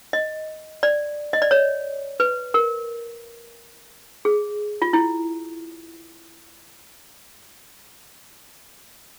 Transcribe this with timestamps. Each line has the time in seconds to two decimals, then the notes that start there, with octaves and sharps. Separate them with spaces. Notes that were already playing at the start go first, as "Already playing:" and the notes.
0.13 D#5
0.83 D5
1.33 D#5
1.42 D5
1.51 C#5
2.20 B4
2.54 A#4
4.25 G#4
4.82 F4
4.93 E4